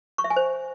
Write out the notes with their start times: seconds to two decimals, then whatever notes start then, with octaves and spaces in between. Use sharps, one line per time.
0.18 C#6
0.24 E5
0.30 G#5
0.36 C5